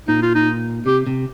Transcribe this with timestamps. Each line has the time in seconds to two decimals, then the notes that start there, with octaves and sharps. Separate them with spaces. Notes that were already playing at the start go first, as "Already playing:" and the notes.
0.08 A#2 D#4
0.22 F4
0.35 D#4
0.86 C3 G4
1.07 C3